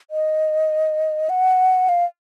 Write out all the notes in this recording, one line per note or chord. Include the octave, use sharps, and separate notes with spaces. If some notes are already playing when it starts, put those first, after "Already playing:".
D#5
F#5
F5